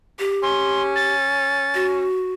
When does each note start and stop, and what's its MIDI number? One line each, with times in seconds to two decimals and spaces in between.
0.19 1.14 67
0.43 2.07 61
0.43 0.82 84
0.96 1.87 93
1.74 2.33 66